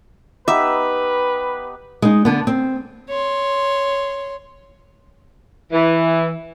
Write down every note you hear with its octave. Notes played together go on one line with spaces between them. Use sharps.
B3 D#4 G4 B4 E5 D6
G#3 D#4
D3 B3
C4
C#5 C6
E3